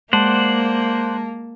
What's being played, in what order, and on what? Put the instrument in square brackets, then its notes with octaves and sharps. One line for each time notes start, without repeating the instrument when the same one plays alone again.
[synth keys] G#3 A5 [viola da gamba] A#3 [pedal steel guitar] C5 D5 F#5